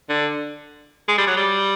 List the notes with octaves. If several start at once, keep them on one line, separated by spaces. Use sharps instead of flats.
D3
G#3
G3
F#3
G3